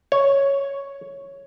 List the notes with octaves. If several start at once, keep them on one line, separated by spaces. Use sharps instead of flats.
C#5